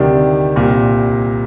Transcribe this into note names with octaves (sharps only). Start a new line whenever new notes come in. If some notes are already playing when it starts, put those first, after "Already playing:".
Already playing: D2 C3 D#3 G3 D4
C2 A#2 G3